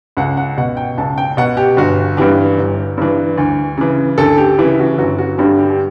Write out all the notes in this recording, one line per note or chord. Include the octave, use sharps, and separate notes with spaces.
C#2 F#5
F#5
B2 F#5
G5
C#2 A5
G5
B2 F#5
G4
G1 F#4
G2 E3 G4
G1
G2 E3
D2
C#3 E3
D2 A4
G4
C#3 E3 E4
F#4
G1 F#4
F#4
G2 D3 G4
G4
G4